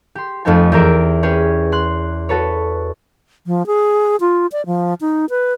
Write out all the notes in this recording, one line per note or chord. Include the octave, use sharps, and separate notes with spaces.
G4 C6
F2 A3 C4 D#4 G4 G#5
E2 G4 A#4 E5 D7
C#4 G4 G#4 B4 C#5
C6 F#6
F#4 A4 B4 C#5
F3
G#4
F4
D5
F3
D#4
B4